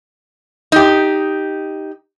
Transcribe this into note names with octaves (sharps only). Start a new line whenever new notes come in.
D#4 G4